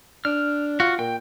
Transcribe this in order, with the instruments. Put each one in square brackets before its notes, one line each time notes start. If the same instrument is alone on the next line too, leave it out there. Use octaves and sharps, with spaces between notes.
[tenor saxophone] D4 [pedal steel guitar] F6
[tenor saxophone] F4 [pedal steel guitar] F#4
[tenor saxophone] A#2 [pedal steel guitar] G5